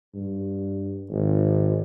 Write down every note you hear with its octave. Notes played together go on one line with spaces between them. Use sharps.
G2
G#1